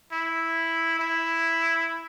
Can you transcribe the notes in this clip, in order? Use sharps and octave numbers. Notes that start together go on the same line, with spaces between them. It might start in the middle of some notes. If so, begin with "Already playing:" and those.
E4
E4